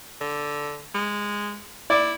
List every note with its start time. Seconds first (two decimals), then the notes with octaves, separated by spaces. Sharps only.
0.21 D3
0.95 G#3
1.90 E4 D5